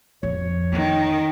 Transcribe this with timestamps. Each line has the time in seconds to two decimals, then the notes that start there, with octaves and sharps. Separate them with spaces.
0.23 F2 C#5
0.72 D#3 A3 C#4 D#4